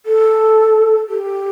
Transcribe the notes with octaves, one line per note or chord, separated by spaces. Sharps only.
A4
G4